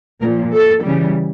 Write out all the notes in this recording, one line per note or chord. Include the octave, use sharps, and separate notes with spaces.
A#2 F3 A#4
A4
C#3 E3 G3